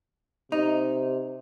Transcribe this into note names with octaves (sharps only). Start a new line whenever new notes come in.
C3 D#4